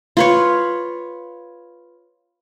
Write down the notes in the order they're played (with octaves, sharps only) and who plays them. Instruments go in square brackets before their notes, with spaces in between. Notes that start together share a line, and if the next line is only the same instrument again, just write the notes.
[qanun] F4 B4 C#5